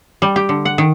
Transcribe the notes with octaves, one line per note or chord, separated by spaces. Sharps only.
G3
G4
D3
F#5
D#3